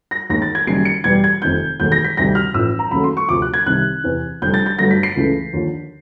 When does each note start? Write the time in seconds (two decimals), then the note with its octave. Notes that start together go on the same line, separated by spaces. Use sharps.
0.11 A#6
0.30 D#2 D#3 G#3 A#6
0.42 A6
0.55 G#6
0.67 F#1 F#2 D#3 G3 C7
0.85 C#7
1.04 E2 B2 G3 G#6
1.24 G#6
1.42 F1 F2 C3 D#3 G6
1.80 E1 D#2 D#3 F#3 A3 G6
1.92 A#6
2.04 B6
2.17 D2 C3 D#3 G3 A#6
2.35 F6
2.54 A1 A2 F3 E6
2.79 A#5
2.91 D#2 C#3 F#3 A3 B5
3.04 C6
3.17 C#6
3.29 D2 C3 F3 D6
3.42 F#6
3.54 G#6
3.66 C2 C3 D#3 F#6
4.04 E2 C3 E3
4.42 F1 F2 D3 G3 G6
4.54 A6
4.66 A6
4.78 G1 G2 D3 F#3 A3 A#6
4.91 B6
5.03 C7
5.17 C#2 C#3 E3 A3
5.53 D#2 D3 F3